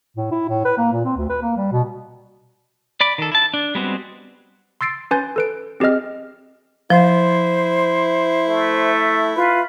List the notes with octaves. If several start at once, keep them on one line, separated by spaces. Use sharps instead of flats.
A2
E4
A2
B4
A#3
A#2
C4
D2
B4
A#3
G3
B2
D5 B5 D6
D#3 A4
E4 A5
D4
G3 G#3 B3 C4 F#4
C6 E6 A6 C7 D7
C#4 B4 G#5 C6 G6 A6
A4 B4 D7
C4 G4 G#4 D#5 F6
F3 E4 C5
A3
F4 B4